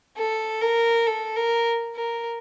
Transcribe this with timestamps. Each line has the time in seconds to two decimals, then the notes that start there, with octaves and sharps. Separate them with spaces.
0.17 A4
0.61 A#4
1.06 A4
1.36 A#4
1.95 A#4